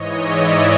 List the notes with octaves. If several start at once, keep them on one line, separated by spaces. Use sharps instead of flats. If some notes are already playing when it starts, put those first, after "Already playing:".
Already playing: G#2 E3 C#5 D#5
D5 E5